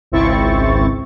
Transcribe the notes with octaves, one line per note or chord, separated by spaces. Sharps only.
G#1 C#2 C4 E4 C#6 A6